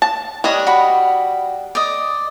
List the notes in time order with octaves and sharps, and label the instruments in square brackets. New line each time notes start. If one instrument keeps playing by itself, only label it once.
[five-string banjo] A5
[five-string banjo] G3 D4 D#5 [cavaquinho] C#5
[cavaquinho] F#4 B5
D5 D#5